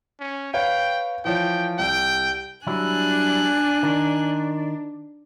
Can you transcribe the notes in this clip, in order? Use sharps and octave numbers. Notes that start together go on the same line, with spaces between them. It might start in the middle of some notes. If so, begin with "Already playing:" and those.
C#4
B4 C#5 F5 G5
E3 F3 C#5 G5
C2 G5
F#3 G3 D4 E4 G#5 F#6
D#3